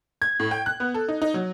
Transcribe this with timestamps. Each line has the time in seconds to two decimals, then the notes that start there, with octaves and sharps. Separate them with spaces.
0.22 G#6
0.39 A2
0.51 G5
0.66 F#6
0.80 B3
0.94 A4
1.08 D#4
1.22 D#4
1.34 F#3